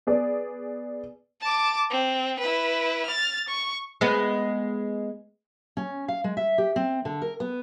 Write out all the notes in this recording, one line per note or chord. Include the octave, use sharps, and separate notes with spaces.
B3 G#4 D5
A5 D6
C4
E4 B4
F6 A6
C#6
G#3 B3
C#4
F5
G#3
E5
G4
C4
D3
A#4
B3